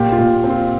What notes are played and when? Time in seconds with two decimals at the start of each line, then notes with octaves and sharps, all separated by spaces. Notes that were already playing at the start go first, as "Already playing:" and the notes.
Already playing: A#2 G4
0.12 F4
0.18 A#2
0.44 C4
0.50 F4